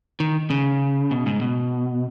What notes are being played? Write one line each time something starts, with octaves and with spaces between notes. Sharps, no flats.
D#3
C#3
B2
G#2
B2